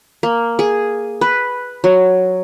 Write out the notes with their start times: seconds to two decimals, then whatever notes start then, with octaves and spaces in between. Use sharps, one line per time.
0.23 A#3
0.59 G#4
1.21 B4
1.84 F#3